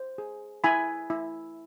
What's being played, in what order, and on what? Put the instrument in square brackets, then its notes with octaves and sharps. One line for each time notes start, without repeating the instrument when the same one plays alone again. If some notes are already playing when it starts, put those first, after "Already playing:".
Already playing: [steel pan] C5
G#4
E4 G#5 B5
E4